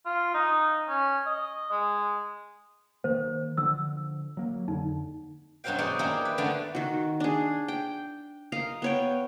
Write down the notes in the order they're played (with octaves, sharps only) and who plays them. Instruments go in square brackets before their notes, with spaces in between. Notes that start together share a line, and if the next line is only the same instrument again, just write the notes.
[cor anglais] F4
D#4
C#4
D#5
G#3
[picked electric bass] D#3 A#3 [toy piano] C5
[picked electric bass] D3 F3 [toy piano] E6
[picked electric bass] F#3 A#3
[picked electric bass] F2 D3 [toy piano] D#4
[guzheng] G2 B2 F#3 C5 F5 G5
G#3 D#4 D5 F#5 G#5
A#3 D4 E4 G4 G#4 A#4
B4
D3 F3 A3 B3 D4
[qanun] D#3 F#4
D4 G#4
G5
A#4 D#5 F5 A#5
B3 C#5 G5